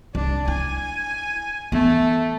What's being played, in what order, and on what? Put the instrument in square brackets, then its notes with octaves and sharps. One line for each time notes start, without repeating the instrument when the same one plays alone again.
[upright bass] C2 [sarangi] D4
[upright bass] E4 [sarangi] G#5
[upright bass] E3 B3 [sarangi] A3